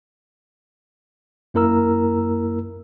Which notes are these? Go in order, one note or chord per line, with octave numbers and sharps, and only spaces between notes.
F#2 A#3 E4 A#4 A#5 E6